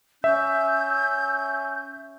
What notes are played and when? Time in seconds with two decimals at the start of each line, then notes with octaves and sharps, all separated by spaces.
0.24 C#4 E5 E6 G6